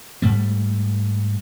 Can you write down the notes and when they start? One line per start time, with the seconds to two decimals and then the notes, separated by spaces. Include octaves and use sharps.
0.22 G#2 G3 A3